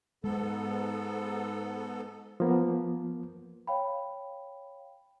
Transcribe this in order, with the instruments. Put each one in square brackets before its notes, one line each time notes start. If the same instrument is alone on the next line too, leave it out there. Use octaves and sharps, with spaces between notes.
[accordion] G#2 B3 A4 [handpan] G#3
[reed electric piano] F3 A#3 B3
[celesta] C#5 F5 G5 B5